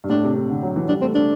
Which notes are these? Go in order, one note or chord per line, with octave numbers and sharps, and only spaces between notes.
G2
A2 D4
C3
C3
D3
F#3
E3
G3 D4
A3 C4
A3 D4